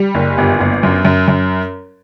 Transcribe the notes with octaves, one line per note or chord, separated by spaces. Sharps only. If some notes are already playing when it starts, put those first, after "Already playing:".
Already playing: G3
F#1
G1
G1
F#2
F#2
F#2